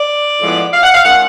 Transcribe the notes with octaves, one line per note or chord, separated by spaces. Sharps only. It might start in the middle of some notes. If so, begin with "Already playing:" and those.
Already playing: D5
A2 F3 G#3 B3 E4
F5
F#5
F5
D#3 G#3 C#4 F4 F#5